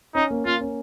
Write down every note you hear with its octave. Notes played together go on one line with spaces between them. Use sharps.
C#4 D#4
A#3
A#3 F4
C#4